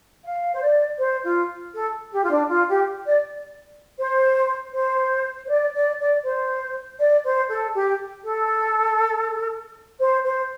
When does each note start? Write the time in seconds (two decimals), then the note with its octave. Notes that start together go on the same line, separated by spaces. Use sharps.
0.24 F5
0.52 C5
0.61 D5
0.99 C5
1.24 F4
1.74 A4
2.11 G4
2.23 F4
2.30 D4
2.49 F4
2.68 G4
3.05 D5
3.99 C5
4.74 C5
5.44 C5
5.49 D5
5.74 D5
5.99 D5
6.24 C5
6.99 D5
7.24 C5
7.49 A4
7.74 G4
8.24 A4
9.99 C5
10.24 C5